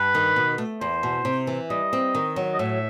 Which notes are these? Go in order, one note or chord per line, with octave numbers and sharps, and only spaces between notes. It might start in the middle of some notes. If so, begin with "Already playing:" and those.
Already playing: G2 B4
D#3
B2
A3
E2 C5
B2
C3
E3
G3 D#5
C4
D#3
F#3
D#5
A2 E5